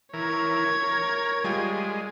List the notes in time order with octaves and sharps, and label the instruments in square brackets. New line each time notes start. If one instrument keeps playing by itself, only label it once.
[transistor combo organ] E3 A#4 [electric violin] C#5 G#6
[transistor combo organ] A#4
[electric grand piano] G3 F4 G5 [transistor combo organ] G#3